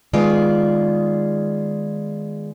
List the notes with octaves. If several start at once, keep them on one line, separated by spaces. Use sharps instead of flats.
D#3 G#3 B3 F4 G#4 D5